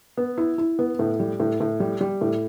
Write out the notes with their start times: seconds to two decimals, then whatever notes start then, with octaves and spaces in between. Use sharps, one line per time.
0.17 B3
0.38 E4
0.58 E4
0.79 B3
0.99 A2
1.20 G3
1.40 A2
1.60 A2
1.80 G3
2.01 G3
2.21 A2